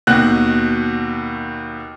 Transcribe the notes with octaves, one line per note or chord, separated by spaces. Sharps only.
D#2 B2 F#4 F#6